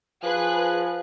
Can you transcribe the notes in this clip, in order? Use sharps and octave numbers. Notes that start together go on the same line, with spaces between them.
F3 G#4 B4 F#6